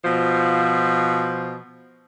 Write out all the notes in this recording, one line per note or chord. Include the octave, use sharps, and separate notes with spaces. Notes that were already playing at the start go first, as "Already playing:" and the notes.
B2 F3